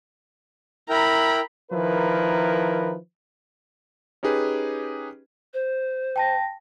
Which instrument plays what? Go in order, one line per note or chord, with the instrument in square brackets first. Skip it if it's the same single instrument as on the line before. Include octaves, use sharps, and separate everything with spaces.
[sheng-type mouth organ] E4 A#4 G5 [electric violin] A#5 B5
[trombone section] D#3 F3 E4 A#4 B4
[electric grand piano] C#4 D#4 G4 G#4 B4
[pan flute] C5
[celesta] G5 A5 A#6